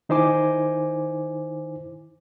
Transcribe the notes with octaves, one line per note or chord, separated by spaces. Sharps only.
D#3 D#4 E4 C5 G#5 D6